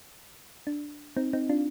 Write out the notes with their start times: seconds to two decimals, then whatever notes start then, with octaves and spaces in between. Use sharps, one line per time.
0.67 D4
1.17 C4 D#4
1.33 C4 D#4
1.49 D4 F4